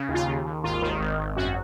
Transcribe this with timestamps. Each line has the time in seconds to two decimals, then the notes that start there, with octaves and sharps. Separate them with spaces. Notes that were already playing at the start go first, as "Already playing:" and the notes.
Already playing: C#3
0.09 D#2
0.14 F4
0.27 D#2
0.45 D#2
0.64 G#1 F4
0.82 D#3
1.00 G#1
1.18 G#1
1.37 F#2 F#4